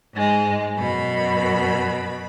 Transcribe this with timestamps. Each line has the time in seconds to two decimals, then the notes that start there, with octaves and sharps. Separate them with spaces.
0.14 G#2 G#3
0.77 F#2 B2 B5